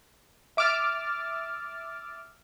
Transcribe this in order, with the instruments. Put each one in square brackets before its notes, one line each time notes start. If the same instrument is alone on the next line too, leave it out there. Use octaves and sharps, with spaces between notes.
[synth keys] E5 D6 E6 F6 A6